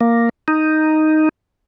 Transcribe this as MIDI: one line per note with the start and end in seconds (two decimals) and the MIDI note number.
0.01 0.29 58
0.48 1.29 63